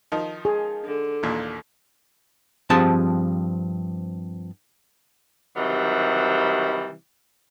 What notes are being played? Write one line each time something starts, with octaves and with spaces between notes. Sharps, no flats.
D#3 F3 D#4
G#4
D3
A1 D#2 A#2
G2 F3 C4 G#4 A5
C3 D#3 E3 F#3 G3